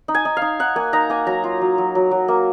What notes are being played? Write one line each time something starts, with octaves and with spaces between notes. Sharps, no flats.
D#4
G#5
D#4
D#4 F5
D#4 F#5
A#3 G#5
D#4 A#5
A#3 G#5
F#3 A#5
F4
F#3
F#3
F#3
F#3
A#3